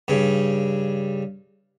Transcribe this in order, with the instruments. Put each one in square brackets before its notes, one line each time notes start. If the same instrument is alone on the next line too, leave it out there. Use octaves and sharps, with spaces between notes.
[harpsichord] G2 C#3